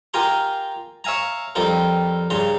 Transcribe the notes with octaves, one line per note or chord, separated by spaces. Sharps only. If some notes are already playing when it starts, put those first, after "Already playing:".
F4 G4 A#4 G#5 A#5 C6
C#5 E5 F5 G#5 A#5
F2 G3 C4 F4 A#4
G2 C#3 A#5 C6